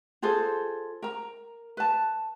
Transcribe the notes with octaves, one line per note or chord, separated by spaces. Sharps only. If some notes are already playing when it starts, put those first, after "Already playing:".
F4 G#4 A4 C5
A#4 A#5
B4 A5